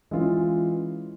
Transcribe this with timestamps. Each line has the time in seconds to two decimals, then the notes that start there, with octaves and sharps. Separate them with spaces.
0.11 E3 G#3 C#4 F4